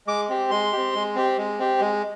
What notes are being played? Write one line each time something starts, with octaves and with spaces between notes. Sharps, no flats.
G#3 D6
C4 G4
G#3 C6
C4 G4
G#3
C4 G4
G#3
C4 G4
G#3